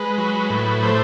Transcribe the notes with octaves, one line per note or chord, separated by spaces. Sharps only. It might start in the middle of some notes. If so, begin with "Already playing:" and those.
Already playing: G#3 B4
F#3
A2
A3 C5